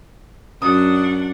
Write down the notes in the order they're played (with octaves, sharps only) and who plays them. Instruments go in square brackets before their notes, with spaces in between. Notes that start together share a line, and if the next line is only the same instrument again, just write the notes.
[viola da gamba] F#2 [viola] D4 F#5 [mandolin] D#6